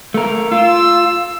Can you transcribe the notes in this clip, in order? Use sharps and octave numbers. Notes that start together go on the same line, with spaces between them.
A3 A#4
F4 E6